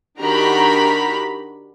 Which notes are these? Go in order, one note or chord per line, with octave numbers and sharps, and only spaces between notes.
D#3 D4 F#4 G4 A#5 B5